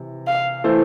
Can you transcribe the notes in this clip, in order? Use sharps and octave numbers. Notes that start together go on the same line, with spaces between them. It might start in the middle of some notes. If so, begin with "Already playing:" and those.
Already playing: C3 E3
F5
E3 A3 E4 A4 C5